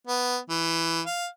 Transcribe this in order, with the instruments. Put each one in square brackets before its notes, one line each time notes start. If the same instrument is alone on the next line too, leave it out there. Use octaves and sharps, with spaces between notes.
[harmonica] B3
E3
F5